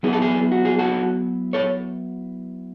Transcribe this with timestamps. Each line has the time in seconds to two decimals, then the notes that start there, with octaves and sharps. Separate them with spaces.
0.03 F#3 B3 E4 G#4
0.13 A4
0.22 G#4
0.52 F#4
0.65 G#4
0.78 F#4 A4
1.53 A4 C#5